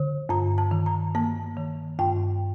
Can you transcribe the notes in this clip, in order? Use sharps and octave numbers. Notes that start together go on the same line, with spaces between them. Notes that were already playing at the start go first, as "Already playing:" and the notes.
Already playing: D3
G2 A#5
A5
D#3
A#5
A#3 A5
D#3
G2 G5